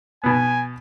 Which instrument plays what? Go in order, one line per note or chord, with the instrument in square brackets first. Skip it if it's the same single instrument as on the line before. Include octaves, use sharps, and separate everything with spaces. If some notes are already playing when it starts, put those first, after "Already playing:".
[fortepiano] B2 B3 [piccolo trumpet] G#5